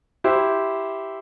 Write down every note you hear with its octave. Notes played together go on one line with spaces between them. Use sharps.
E4 G4 C5